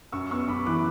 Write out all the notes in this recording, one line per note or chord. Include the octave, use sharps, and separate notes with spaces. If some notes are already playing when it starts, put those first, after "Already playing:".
F#2 C#6 E6
B3 C#6 E6
F#2 B5 D6
E3 D6 F#6